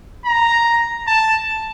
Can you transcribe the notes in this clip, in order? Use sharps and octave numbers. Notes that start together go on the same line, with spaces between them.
A#5
A5